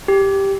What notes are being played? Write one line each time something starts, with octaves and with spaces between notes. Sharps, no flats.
G4